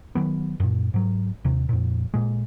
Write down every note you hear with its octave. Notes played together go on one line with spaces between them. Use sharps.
D#3 F#3 B3
F#2 A#2
G#2 F#3
D#2 C3
F2 A#2
A#2 G#3